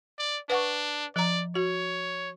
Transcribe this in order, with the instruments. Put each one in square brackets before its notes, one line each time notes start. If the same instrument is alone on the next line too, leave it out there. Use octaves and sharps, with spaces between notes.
[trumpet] D5
[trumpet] D4 [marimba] B4 F#5 C#6
[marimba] F3 A#5 [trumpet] D5
[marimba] F#4 [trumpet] C#5